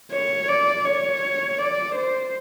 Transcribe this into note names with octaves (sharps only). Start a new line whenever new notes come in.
C#5
D5
C#5
D5
C5